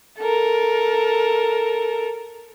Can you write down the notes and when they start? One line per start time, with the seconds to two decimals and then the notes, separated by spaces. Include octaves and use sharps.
0.19 A4 A#4